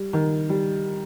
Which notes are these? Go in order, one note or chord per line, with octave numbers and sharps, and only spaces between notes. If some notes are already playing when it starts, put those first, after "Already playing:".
Already playing: G3
D#3
G3